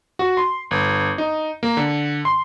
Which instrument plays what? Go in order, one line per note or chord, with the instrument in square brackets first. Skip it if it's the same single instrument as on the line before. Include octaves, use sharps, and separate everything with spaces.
[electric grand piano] F#4
C6
G1
D#4
A#3
D3
C6